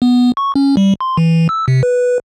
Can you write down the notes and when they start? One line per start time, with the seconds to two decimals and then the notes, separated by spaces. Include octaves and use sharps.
0.02 B3
0.37 C#6
0.55 C#4
0.77 G3
1.01 C6
1.17 E3
1.49 E6
1.68 C3
1.83 B4